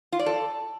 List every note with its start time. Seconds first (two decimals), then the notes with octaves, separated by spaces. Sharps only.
0.12 F4
0.19 D5
0.26 A4